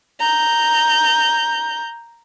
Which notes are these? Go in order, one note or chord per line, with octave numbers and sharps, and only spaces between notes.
A#5 G6